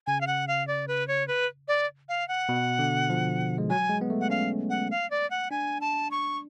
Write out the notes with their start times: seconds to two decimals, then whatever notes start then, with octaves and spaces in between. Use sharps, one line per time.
0.07 C#3 G#5
0.21 F5
0.27 F#5
0.48 F5
0.67 D5
0.88 B4
1.08 C#5
1.28 B4
1.68 D5
2.09 F5
2.28 F#5
2.49 B2
2.79 D3
3.10 F3
3.58 G#3
3.70 F#3 G#5
3.90 G#3
4.01 B3
4.10 A3
4.21 F#5
4.30 C#4 F5
4.70 F#5
4.91 F5
5.11 D5
5.31 F#5
5.51 D4 G#5
5.81 A5
6.11 C#6